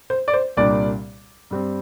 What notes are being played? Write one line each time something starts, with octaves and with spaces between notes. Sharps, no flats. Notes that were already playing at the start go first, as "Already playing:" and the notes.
C5
D5
C5
C2 A#2 G3 A#3 D4 D5
G2 G3 C4